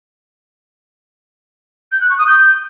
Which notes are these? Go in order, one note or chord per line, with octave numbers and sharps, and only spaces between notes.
G6
F#6
C#6
D#6
G6